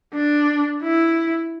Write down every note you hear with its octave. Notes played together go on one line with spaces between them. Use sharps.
D4
E4